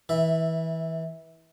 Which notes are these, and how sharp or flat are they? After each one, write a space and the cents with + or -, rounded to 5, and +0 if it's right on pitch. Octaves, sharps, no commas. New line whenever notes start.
E3 -25 E5 +0